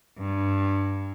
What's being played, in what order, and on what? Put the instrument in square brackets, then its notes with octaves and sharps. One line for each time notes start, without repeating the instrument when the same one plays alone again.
[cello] G2